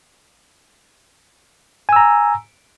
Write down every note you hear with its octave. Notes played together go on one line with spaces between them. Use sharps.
G#5 A#5 E6